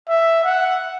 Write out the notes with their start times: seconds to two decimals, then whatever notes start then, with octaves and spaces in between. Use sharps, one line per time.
0.08 E5
0.44 F#5